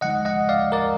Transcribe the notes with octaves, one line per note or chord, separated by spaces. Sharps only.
D3 F3 G#3 D#4 D#5 F#5
D#5 F#5
D5 F5
A#4 D5